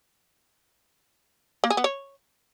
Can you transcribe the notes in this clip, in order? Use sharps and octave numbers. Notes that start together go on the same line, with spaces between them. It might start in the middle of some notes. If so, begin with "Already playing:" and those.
A#3
G#4
B3
C#5